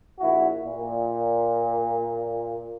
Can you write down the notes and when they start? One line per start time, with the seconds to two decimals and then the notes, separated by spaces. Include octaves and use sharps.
0.19 A#1 E4 F#4
0.64 A#2